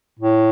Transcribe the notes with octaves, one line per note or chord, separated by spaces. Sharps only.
A2